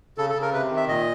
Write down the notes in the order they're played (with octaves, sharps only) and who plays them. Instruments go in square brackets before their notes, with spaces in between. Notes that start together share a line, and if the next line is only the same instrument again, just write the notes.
[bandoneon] C#3 A4
A4
C#3
A#4
C3 B4
D#3
E5
A#2 D#5